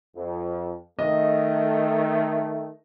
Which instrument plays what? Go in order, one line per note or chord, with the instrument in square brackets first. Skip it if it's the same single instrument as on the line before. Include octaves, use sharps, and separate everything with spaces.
[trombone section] F2
[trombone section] D#3 A3 [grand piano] D#5